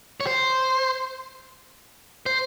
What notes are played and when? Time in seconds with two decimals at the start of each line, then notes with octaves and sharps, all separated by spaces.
0.20 C#5
0.27 C5
2.26 C5